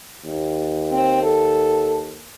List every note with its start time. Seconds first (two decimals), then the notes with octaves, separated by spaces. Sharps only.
0.25 D#2
0.91 C4
1.22 A4